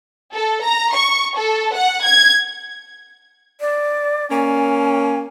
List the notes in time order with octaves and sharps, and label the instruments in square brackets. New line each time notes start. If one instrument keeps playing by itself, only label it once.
[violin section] A4
A#5
C#6
A4
F#5
G#6
[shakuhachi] D5
[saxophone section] A#3 C#4 [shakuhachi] G#5